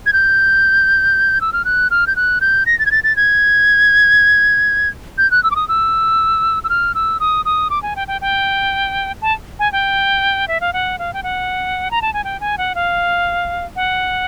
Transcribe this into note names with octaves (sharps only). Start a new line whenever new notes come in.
G#6
G6
E6
F6
F#6
F6
G6
F#6
G6
A#6
A6
G#6
A6
A6
G#6
G6
F#6
E6
D6
D#6
E6
E6
F6
E6
D#6
D#6
D6
G#5
G5
G5
G5
A5
G#5
G5
E5
F5
F#5
F5
G5
F#5
A#5
A5
G#5
G5
G#5
F#5
F5
F#5